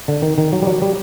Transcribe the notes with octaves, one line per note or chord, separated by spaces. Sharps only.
D3
D#3
D#3
F#3
G3
F#3
G3